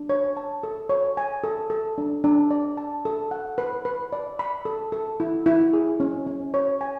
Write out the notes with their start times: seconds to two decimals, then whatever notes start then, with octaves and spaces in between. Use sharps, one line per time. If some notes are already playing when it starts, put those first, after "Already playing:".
Already playing: D4
0.09 C#5
0.37 A5
0.63 A4
0.89 C#5
1.17 G#5
1.44 A4
1.70 A4
1.98 D4
2.24 D4
2.51 D5
2.77 A5
3.05 A4
3.31 F#5
3.58 B4
3.85 B4
4.13 D5
4.39 B5
4.65 A4
4.92 A4
5.20 E4
5.46 E4
5.73 G#4
6.00 C#4
6.27 C#4
6.54 C#5
6.81 G#5